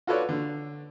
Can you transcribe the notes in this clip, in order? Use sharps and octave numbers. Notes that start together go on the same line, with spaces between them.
F4 F#4 A4 B4 C#5 D5
D3